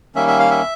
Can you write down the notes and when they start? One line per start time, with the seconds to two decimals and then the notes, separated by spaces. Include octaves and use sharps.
0.15 D#3 G3 A#3 C#4 E5
0.28 E5
0.39 F5
0.51 E5